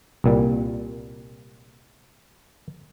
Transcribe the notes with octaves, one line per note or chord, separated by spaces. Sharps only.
C2 A#2 G3